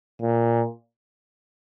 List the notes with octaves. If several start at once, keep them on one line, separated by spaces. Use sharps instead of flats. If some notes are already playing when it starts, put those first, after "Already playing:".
A#2